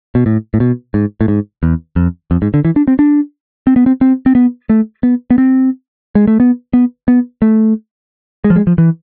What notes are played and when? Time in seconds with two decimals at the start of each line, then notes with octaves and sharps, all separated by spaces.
0.15 B2
0.26 A2
0.54 A2
0.60 B2
0.94 G#2
1.21 A2
1.28 G#2
1.63 E2
1.96 F2
2.31 F2
2.42 G#2
2.54 D3
2.65 E3
2.76 D4
2.88 C4
2.99 D4
3.67 C4
3.76 B3
3.86 C4
4.01 C4
4.26 C4
4.35 B3
4.69 A3
5.03 B3
5.30 B3
5.38 C4
6.15 G#3
6.27 A3
6.40 B3
6.73 B3
7.08 B3
7.42 A3
8.44 G#3
8.50 F3
8.56 G#3
8.67 F3
8.78 E3